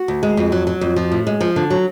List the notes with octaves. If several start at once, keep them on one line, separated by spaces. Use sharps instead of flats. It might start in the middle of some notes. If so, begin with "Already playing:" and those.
Already playing: F#4
D2
G#3
F2
F#3
F#3
F2
F3
A2
G#3
F3
D3
F#3